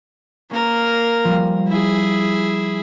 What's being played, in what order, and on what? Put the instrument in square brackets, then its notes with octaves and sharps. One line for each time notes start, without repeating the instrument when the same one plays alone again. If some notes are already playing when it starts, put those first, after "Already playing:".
[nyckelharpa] A#3 A#4 [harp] C#4
[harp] F3 G3
[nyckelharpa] E4 G#4